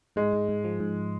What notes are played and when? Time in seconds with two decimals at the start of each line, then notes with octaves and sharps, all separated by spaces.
0.16 G#2 G#3
0.33 G#2
0.49 G#2
0.64 F3
0.80 G#2